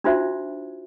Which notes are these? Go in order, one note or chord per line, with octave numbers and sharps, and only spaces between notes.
D4 D#4 F4 F#4 C5 E5